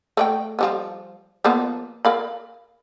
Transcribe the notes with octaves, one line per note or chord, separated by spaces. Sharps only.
A3 D5 G5
F3 G3 B3
F3 A#3 B3
A#4 F5 B5